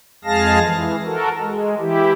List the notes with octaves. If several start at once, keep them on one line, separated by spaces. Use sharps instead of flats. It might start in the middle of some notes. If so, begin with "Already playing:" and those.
F2 G#3 G#4 F5 A5 A#6
E3
F#4 A4 A#4
G#3
E3 E4 G4